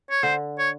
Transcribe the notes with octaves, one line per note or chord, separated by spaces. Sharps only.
C#5
D3 C5
C#5